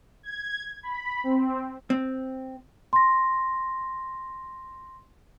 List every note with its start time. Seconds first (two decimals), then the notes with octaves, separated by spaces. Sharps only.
0.23 G#6
0.83 B5
1.24 C4
1.90 C4
2.93 C6 A#6